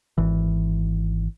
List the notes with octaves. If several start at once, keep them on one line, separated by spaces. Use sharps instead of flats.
G#1 E3